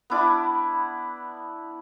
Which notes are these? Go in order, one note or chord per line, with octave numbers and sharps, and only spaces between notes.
B3 D4 E4 D5